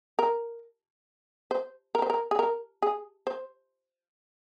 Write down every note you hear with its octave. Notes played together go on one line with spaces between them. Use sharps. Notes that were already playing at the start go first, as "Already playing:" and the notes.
A#4
C5
A#4
C5
A#4
G#4
A#4
G#4
C5